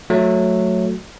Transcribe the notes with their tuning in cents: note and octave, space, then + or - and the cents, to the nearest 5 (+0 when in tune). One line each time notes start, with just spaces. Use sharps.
F#3 -10 A3 +0